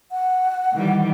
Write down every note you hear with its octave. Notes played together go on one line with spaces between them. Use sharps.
F#5
D#3 E3 G3